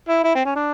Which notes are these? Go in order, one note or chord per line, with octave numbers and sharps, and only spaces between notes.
E4
E4
C4
C#4
D4